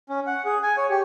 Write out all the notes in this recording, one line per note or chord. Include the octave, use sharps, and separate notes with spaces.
C#4
F#5
G#4
G#5
C#5
G4